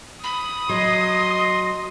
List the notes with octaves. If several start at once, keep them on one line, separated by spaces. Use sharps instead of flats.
B5 D#6
F#3 D#5 C6